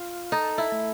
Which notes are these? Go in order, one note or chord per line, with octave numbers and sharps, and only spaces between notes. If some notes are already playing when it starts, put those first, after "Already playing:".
Already playing: F4
D#4 A4
E4
A3